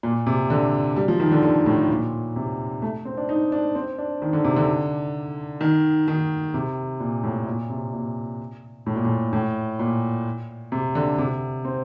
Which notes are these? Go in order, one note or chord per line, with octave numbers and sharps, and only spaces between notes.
A#2
C3
D3
G3
F3
D#3
D3
D3
A2
A#2
C3
A3
C4
D4
D#4
D4
C4
D4
D#3
D3
C3
D3
D#3
D#3
C3
A#2
A2
A#2
C3
A#2
A2
A#2
A2
A2
A#2
C3
D3
C3
C4